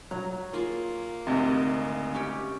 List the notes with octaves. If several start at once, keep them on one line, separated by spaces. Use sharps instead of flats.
F#3 A#5
A#3 F4 G#4
G#1 D2 C3 D#5
C#4 G4